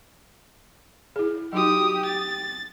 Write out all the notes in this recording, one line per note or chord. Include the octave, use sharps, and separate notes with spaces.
E4 G#4
F#3 D#4 F#4 G4 D#6
A6